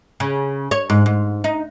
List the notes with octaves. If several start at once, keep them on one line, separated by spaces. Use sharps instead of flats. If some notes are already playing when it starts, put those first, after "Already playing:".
C#3
C#5
G#2
G#2
D#4